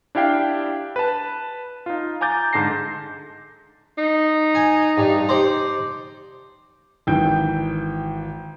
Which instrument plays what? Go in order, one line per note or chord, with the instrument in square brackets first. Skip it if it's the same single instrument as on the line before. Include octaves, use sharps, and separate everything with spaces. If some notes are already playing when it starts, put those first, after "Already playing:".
[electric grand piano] D4 E4 G4 F5 G5
B4 A5
D#4 F4
G#5 A#5 D6 G6 A6
G#2 D3 A5 A#6 C7
[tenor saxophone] D#4
[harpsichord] G#5
G2
C5 D5
[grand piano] G#1 E3 G5 G6